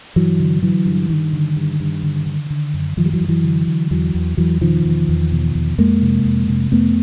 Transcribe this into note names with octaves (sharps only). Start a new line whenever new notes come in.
G2 E3 F#3
D3
D3 E3 F#3
G2
G2 D#3
D3
G2
G2
D3
D3
D3
F#2
F#2 D#3 F3
G3
E3 F#3
F#2
E3 F#3
D3
D3
E2 E3 F#3
E2
E2 E3 F#3
B2 D#3 F3
E2
E2
B2
E2
F2 G#3 A#3
C3
F2
C3
F2 A3 B3